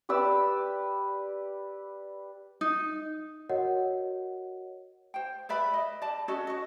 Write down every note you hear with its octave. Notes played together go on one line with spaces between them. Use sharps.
G4 B4 D5 E6
D#4
F#4 A#4 C#5 D#5 F#5
C5 G5
B4 D5 E5 B5
D#5
D5 A5
C#4 F#4 A4 D#5
F#4 D#5